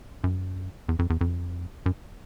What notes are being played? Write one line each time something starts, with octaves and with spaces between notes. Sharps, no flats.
F#2
E2
F2
E2
F2
F#2